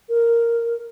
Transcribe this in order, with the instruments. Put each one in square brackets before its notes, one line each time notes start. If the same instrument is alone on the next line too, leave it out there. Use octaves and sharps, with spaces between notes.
[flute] A#4